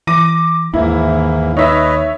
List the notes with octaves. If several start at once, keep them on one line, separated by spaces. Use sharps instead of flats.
E3 D6 A#6 D#7
D#2 G#2 D#3 E3 A#3 E4
D#4 B4 C#5 D#5 E5 E6